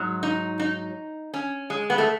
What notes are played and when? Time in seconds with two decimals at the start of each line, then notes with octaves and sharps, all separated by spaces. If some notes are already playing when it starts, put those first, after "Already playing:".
Already playing: G#2 F#3
0.23 D#4
0.59 D#4
1.34 C#4
1.70 G#3
1.90 B3
1.98 A3